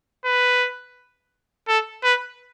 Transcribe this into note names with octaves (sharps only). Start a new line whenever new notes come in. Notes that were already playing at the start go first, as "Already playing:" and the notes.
B4
A4
B4